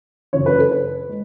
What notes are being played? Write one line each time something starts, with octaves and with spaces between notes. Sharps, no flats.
F#2 C#3 E3 C#5
B4
A4
B4
G#3